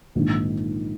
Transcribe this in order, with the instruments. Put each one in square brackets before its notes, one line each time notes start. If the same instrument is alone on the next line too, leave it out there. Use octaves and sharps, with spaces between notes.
[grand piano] A#1 G#2 D#3